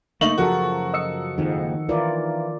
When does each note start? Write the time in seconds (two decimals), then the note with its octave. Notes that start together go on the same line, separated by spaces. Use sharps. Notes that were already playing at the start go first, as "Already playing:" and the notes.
0.21 F#1 A3 A#3 D#4 C#6 F#7
0.38 F#2 C#3 F3 F#3 F#4 A4 A#4
0.94 D#5 E6 C#7
1.38 F#1 F2 G#2 D#3
1.89 E3 F4 A#4 D5